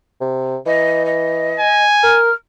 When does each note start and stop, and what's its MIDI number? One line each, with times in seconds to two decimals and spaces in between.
0.21 0.57 48
0.66 1.59 52
0.66 1.03 75
1.05 1.83 75
1.59 2.20 80
2.03 2.30 70
2.03 2.33 89